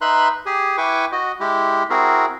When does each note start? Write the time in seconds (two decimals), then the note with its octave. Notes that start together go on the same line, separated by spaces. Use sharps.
0.01 D#4 B4 E5 B5 C6 F#6
0.46 G4 G#4 G#5
0.78 E4 B4 G5 G#5 C#6 D6
1.12 F#4 D#5
1.40 G#3 E4 G4
1.90 C4 E4 F#4 G#4 A#4